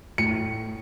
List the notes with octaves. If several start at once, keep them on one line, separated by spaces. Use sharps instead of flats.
A2 C#7